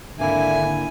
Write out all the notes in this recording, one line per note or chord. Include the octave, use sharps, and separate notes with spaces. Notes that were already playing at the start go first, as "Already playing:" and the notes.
G#1 D3 A#3 E4 E5 G#5